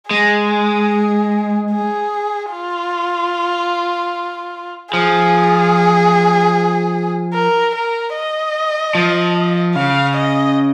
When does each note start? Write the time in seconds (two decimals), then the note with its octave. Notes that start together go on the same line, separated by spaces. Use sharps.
0.11 G#3 G#4
1.72 G#4
2.53 F4
4.93 F3 G#4
7.34 A#4
7.75 A#4
8.15 D#5
8.95 F3
9.75 C#3 F5
10.16 D#5